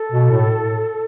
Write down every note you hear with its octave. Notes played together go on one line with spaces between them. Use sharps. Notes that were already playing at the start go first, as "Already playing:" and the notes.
Already playing: A4
B2
A2